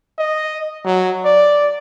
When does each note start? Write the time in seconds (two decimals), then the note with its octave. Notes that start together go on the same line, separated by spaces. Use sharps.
0.18 D#5
0.86 F#3
1.25 D5